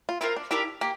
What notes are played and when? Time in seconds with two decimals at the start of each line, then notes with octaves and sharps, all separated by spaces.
0.09 F4
0.21 C4 E4 F4 A#4
0.36 D4
0.51 D4 E4 G4 A#4 F5
0.81 A#3 G4